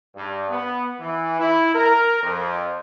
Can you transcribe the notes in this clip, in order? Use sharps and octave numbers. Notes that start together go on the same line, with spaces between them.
G2
B3
E3
E4
A#4
F2